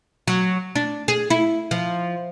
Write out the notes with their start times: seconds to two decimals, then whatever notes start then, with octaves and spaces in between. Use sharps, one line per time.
0.28 F#3
0.76 D4
1.08 G#4
1.30 E4
1.71 F3